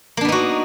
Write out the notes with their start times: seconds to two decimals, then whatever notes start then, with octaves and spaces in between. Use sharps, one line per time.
0.17 A#3
0.21 D4
0.25 B3
0.28 D#4
0.32 F#4